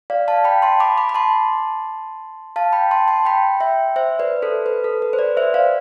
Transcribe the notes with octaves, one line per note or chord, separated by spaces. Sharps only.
D5 F5
F5 A5
G5 B5
A5 C6
B5 D6
B5 D6
B5
A5 C6
F5 A5
G5 B5
A5 C6
A5 C6
G5 B5
E5 G5
C5 E5
B4 D5
A4 C5
B4
A4
B4
C5
B4 D5
C5 E5
D5 F5